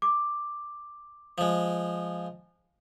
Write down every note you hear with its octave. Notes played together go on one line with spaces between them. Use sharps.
D6
F3 G#3